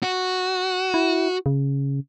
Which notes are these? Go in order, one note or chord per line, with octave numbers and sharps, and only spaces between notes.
F#4
E4
C#3